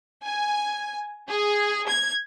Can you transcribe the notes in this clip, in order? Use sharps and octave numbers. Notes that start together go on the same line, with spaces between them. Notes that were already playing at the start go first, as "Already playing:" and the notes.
G#5
G#4
G#6